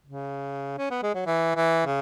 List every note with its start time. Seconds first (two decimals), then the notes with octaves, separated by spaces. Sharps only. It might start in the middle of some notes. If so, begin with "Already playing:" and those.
0.06 C#3
0.78 C#4
0.90 B3
1.03 G#3
1.15 F#3
1.26 E3
1.56 E3
1.86 C#3